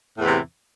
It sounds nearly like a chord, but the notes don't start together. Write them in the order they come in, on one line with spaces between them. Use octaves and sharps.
A2 E2 E3 C3